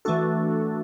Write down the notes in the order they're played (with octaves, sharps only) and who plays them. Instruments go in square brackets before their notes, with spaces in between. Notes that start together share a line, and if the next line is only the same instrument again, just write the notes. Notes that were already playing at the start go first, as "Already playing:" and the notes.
[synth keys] E3 A3 D4 F#4 A4